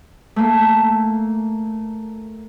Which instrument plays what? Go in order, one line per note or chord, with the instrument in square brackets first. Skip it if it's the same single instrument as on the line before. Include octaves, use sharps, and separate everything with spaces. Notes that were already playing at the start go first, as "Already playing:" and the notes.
[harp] A3 A#3